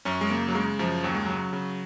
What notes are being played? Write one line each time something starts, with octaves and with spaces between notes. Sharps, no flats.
F#2 C#4
G#3
C#3 A#3
F#3
C#3 G#3
F#2 F3
D#2 F#3
G#3
C#3 F#3
C#3